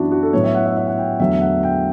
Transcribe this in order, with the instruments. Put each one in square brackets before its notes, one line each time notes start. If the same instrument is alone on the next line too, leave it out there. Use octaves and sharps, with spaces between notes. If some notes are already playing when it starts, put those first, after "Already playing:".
Already playing: [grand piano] F#2 E3 B3 D4 E4 F#4
F#4
A4
A2 F#3 B3 C#5
E5
F#5
E5
E5
F#5
G5
E2 D3 F#3 A3 E5
F#5
G5